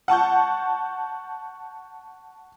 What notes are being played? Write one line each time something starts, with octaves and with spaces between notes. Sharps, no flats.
F#5 A5 C#6 G6